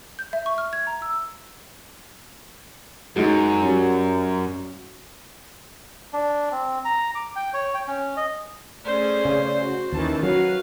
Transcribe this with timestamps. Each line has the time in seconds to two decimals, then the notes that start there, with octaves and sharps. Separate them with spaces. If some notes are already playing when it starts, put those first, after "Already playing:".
0.19 G6
0.33 E5
0.46 C#6
0.58 F6
0.73 G#6
0.87 A#5
1.02 E6
3.16 F#2 F#3 G#3 D#4
3.62 F#3 G3 C#4
6.13 D4
6.52 C4
6.85 A#5
7.15 D6
7.36 G5
7.54 C#5
7.74 G5
7.87 C#4
8.17 D#5
8.85 A3 C#4 G#4 C5 D5
9.25 C#3
9.60 F#4
9.92 D#2 D#3 E3 C#4 A5
10.23 F#3 F#4 B4 F5